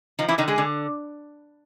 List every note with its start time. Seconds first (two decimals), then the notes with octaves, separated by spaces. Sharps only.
0.19 D#3 F3 D#4
0.28 E3 E4
0.38 D3 D#3 D#4
0.48 G#3 G#4
0.58 D3